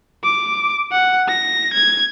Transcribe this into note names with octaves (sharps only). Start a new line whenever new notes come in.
D6
F#5
A#6
G#6